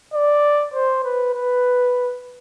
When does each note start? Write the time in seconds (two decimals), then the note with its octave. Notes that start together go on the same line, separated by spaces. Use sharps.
0.14 D5
0.74 C5
1.04 B4
1.34 B4